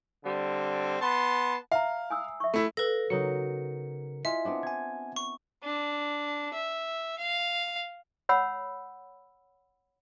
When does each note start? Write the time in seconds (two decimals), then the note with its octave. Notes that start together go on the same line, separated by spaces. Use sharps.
0.25 D3 G3 C4
1.01 B3 A5 C6
1.72 E5 F5 A#5
2.10 G#5 D#6 E6
2.40 E5 C#6
2.54 A3 E4
2.77 A4 B4 F5 A#6
3.10 C#3 F#3 D#4 A#4 C#7
4.25 E4 F4 D#5 E5 G#5
4.45 B3 C4 D4
4.63 G#5 G#6
5.16 C#6
5.64 D4
6.54 E5
7.19 F5
8.29 C#5 F#5 B5 E6